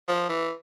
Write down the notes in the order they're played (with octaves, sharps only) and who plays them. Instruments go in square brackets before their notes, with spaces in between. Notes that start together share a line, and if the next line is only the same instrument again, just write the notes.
[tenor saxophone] F3
E3